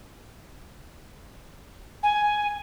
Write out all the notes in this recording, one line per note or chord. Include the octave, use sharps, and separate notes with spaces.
G#5